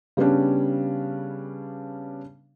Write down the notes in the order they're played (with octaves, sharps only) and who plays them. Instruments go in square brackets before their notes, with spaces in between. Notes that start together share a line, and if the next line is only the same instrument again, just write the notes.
[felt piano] C#3 G3 B3 C#4 D4